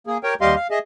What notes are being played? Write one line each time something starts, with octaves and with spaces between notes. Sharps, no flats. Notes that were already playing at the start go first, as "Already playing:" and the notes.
A#3 G#4
G4 A#4 C#5 G5
D#2 G3 G4 D#5 F5 C6
F5
G#4 D#5 E5